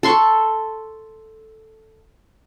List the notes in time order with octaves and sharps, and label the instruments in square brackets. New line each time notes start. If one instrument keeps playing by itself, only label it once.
[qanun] A4 C6 C#6